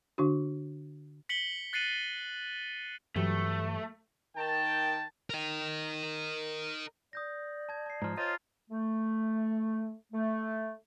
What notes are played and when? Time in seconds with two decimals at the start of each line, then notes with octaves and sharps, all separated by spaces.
0.18 D3 D4 F#4
1.29 B6 C#7 F#7 G7
1.73 F#6 A6 C7 C#7 D#7 F#7
3.16 G2 E3 F#3 A3 G4 B4
4.36 D#3 G5 A5
5.30 A#4 D#5
7.13 D5 D#6 G6 A#6
7.69 A5 G#6
7.86 A5 C7
8.02 G#2 F3 A#5 F6
8.18 F4 C5 C#5 D#5 F6 A6
8.71 A3
10.13 A3